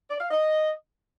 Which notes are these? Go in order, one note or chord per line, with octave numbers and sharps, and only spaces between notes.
D5
F5
D#5